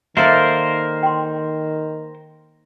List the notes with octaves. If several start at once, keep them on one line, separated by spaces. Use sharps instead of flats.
D#3 A#3 A4 A#4 C5 D5 E5
G5 C6